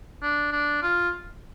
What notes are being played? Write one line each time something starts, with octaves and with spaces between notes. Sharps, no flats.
D4
D4
F4